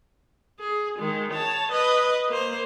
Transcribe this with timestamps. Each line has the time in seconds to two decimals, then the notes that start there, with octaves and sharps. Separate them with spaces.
0.60 G#4
0.99 D#3 G#3
1.32 C#5 A5
1.71 B4 D#5
2.29 A#3 C5